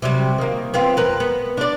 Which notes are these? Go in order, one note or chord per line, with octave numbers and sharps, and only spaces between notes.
C3 F#3 G3
D#3 A#3
B3 C4 F4
F2 A#4 B4
B3
D4 D5